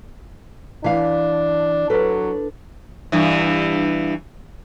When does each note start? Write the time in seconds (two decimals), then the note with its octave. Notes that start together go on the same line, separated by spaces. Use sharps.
0.84 E3 D4 F5
1.90 F#3 D4 A4 B4
3.12 G2 E3